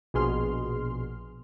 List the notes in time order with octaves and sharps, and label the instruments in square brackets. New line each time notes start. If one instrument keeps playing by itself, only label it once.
[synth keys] A#1 B2 G#4 C6 F6